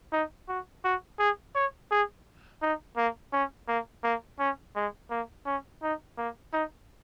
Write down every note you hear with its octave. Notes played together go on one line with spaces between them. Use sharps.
D#4
F#4
F#4
G#4
C#5
G#4
D#4
A#3
C#4
A#3
A#3
C#4
G#3
A#3
C#4
D#4
A#3
D#4